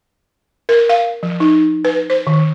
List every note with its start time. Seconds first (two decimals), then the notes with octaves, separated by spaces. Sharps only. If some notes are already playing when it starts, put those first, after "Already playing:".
0.69 A#4
0.89 F5
1.23 F3
1.40 D#4
1.85 B4
2.10 C5
2.27 D#3